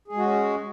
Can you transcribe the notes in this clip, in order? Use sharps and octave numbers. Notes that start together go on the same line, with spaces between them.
G#3 C#4 F#4 G#4